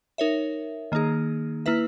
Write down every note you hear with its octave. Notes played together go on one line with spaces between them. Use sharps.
D#4 A#4 C#5 E5
D#3 A#3 D#4 G#4
A#3 E4 B4 E5